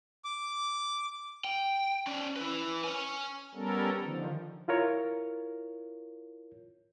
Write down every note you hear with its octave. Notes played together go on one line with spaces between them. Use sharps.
D6
G5
C#4 D5
E4 B4
C#5 G#5
G3 B3 C#4 A4 A#4
D3 D#3 F3
E4 F4 A#4 C#5